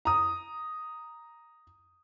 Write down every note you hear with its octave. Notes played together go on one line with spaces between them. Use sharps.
A#5 D#6